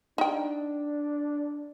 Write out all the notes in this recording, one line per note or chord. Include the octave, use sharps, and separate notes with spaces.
D4 D#4 G5